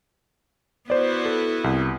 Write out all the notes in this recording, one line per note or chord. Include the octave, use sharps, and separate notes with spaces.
B3 E4 F#4 C5 D5
A4
C2